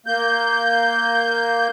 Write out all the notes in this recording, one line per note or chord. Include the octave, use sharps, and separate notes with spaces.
A#3 G6